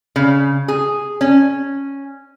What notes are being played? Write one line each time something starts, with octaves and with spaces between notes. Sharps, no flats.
C#3
G#4
C#4